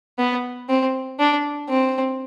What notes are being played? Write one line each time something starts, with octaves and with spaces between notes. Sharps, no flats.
B3
C4
D4
C4